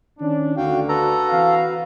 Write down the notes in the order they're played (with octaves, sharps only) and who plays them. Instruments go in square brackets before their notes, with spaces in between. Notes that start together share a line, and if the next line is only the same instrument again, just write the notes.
[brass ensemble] D#3 C#4 D4
[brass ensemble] D2 D3 [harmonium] F#4 F5 G5
[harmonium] F#4 B4 [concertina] A4 A#5
[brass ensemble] E3 C4 F5